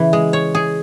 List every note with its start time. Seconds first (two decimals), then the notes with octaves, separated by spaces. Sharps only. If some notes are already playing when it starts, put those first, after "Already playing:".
Already playing: C#3 E3
0.13 G#3
0.33 C#5
0.55 G#4